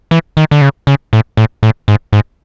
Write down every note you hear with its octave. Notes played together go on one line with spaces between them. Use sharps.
E3
D#3
D3
C#3
C#3
A2
A2
A2
G#2
G#2